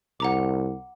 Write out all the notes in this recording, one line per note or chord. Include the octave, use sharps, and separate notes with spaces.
C2 F#5 A#5 D6